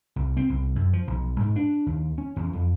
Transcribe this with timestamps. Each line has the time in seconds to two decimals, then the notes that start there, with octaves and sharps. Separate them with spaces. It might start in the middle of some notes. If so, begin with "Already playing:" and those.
0.16 C2
0.37 C4
0.49 C2
0.76 F#2
0.93 F3
1.07 B1
1.40 G#2
1.56 D4
1.86 D#2
2.18 C#4
2.36 E2
2.53 F2